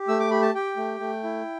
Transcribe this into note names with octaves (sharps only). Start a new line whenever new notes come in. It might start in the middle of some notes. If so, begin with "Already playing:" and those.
Already playing: G4
A3 E6
D6
G4 B5
A5
G4 G5
A3
A3
E4